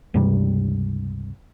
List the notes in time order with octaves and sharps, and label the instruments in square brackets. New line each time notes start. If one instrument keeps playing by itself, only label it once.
[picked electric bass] C#2 G2 C3 G3